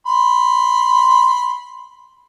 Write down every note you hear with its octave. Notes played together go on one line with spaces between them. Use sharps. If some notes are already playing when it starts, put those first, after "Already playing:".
B5 C6